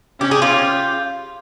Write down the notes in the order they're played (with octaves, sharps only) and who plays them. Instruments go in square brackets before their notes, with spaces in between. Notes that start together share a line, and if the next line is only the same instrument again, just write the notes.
[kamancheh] C#4 [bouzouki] G4
[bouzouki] G#4
F4 G4